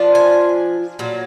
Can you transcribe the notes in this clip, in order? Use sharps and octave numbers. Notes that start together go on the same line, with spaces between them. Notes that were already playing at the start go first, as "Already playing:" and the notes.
Already playing: F3 D4 F4
G#5
A#2 F#3